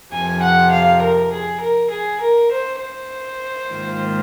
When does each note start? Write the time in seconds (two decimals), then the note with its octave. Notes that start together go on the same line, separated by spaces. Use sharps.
0.12 F2 C3 F3 G#5
0.42 F#5
0.72 F5
1.02 A#4
1.31 G#4
1.60 A#4
1.91 G#4
2.20 A#4
2.50 C5
2.79 C5
3.69 G#2 D#3 A#3 F4